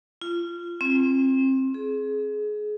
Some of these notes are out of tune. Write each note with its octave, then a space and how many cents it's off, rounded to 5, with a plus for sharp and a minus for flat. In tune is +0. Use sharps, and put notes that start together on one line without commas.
F4 -25
C4 +25
G#4 +25